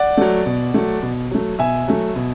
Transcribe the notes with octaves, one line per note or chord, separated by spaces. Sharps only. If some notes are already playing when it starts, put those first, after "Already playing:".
Already playing: D5 F#5
F#3 A3
B2
F#3 A3
B2
F#3 A3
B2 E5 G#5
F#3 A3
B2